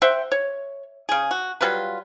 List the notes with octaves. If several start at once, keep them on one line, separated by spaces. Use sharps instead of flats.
C5 E5 F#5 G5
C#5
C#3 G#4
F#4
F#3 G3 F4 B4